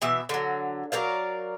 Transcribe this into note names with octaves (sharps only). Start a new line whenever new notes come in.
B2 E3 E5
D3 F#3
F#3 A#4 D5 F5